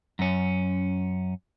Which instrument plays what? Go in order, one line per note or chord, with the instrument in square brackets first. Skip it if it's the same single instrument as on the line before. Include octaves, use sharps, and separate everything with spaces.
[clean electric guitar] F#2 C#4